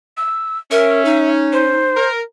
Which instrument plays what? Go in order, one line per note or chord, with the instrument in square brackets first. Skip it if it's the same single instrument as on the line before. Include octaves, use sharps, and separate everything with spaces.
[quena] E6
[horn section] C#4 [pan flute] A#4 [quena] E5
[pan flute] D#4
[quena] C5
[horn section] A#4